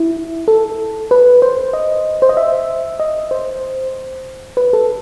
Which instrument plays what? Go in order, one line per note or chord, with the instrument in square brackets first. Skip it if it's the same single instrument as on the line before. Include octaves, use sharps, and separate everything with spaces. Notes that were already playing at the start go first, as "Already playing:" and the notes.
Already playing: [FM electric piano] E4
A4
B4
C5
D#5
C5
D#5
E5
D#5
C5
B4
A4